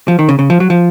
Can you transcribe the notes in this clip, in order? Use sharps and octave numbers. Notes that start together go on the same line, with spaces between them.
F3
D#3
C#3
C#3
F3
F#3
F3